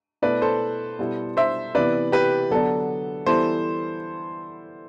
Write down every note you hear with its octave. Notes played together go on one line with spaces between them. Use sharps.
B2 A3 E4 B4 D5
A4 C5
B2 G3 B3 E4
C5 E5
C3 E3 B3 E4 B4 D5
G4 B4
D3 F#3 B3 D4 A4
E3 G3 B3 E4 A4 C5